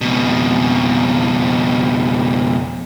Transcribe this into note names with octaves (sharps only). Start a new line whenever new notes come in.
F2 B2